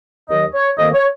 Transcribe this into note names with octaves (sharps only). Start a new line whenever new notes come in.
D#2 D#3 F#3 D#5
C#5
F2 D#3 A#3 D#5
C#5